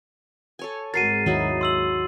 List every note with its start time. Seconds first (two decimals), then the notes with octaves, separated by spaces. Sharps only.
0.59 A4 C#5 G#5
0.94 G#1 G#3 F#4 A#4 A6 C7 D#7
1.26 D#2 F#3 D#4 E4
1.61 C6 E6 F#7